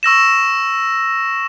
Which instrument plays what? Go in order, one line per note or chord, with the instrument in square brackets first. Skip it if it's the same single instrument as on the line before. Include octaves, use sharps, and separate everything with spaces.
[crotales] C#6 E6 A#6 E7